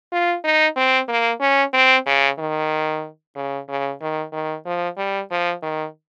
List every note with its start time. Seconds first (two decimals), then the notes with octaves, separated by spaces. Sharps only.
0.12 F4
0.44 D#4
0.77 C4
1.09 A#3
1.41 C#4
1.73 C4
2.06 C#3
2.39 D#3
3.36 C#3
3.69 C#3
4.02 D#3
4.33 D#3
4.66 F3
4.98 G3
5.31 F3
5.63 D#3